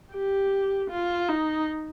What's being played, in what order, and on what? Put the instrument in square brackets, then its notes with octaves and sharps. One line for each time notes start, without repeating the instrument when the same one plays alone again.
[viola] G4
F4
D#4